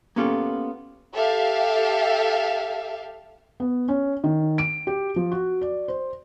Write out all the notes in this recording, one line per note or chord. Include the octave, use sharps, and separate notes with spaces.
A#3 B3 C#4 F4 G4 A4
G4 A4 E5 F5
B3
C#4
D#3
D7
G4
F3
F#4
D5
C5